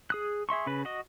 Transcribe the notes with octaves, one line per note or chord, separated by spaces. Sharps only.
G#4 D#6 F#6
G#4 E5 C6 C#6
C#3 B4
F#4 D#5